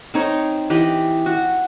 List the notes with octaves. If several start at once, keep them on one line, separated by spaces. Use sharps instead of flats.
C4 D#4 C#5
E3 G4 D#5
F#4